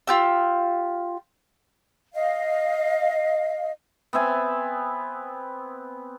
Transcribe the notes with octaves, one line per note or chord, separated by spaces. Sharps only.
F4 G4 E6
D#5 F5
B3 C4 E5 G#5